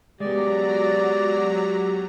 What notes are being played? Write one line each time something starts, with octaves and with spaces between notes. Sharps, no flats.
F#3 G#3 B3 G4 D5 A#5